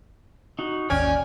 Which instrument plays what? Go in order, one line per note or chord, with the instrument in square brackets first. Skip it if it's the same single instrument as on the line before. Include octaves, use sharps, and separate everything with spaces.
[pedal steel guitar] D#4 F#4
[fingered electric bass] D#1 G#1 D#2 [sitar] C#4 [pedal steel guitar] D5 G5 F6 [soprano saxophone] G#5